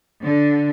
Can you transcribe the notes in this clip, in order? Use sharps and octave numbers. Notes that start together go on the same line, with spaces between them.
D3